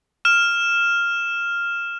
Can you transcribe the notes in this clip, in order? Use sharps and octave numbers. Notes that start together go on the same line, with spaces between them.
F6 E7